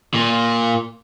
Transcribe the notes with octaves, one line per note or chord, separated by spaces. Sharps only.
A#2